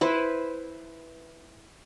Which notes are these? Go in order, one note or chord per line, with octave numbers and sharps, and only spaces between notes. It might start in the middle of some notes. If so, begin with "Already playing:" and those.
E4 B4 C5